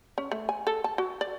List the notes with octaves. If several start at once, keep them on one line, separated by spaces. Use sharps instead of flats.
C#4
A3
G#5
A4
A5
F#4
D5